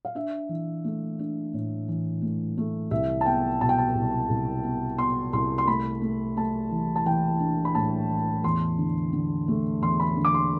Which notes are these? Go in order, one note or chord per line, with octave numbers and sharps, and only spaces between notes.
F5
D4 E5
E3
A3
D4
A2
E3
A3
A3
C2 E5
A5
B3 G5
B2 A5
G5
A5
C2
C2
B3
B3 C6
C2 C6
C6
A3 B5
A3
A3 A5
E3
A5
E3 G5
D4
B5
A2 A5
E3
E2 C6
D3
D3
A3
E2 C6
B5
D3
D6
C6